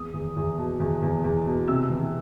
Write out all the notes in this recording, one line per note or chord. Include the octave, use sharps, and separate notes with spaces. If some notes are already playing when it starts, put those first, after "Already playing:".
Already playing: E2 D#6
E2
E2
B2
E2
E2
E2
B2
C3 E6
E3